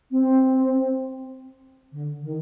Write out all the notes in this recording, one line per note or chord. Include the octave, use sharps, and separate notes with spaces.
C4
D3
D#3